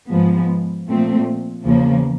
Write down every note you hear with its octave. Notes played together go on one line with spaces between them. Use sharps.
G#2 F3 G#3 B3
A#2 F3 A3 C4
E2 C#3 F3 A#3